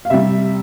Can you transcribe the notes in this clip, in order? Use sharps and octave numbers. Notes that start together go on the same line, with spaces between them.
F5
C3 G3 E5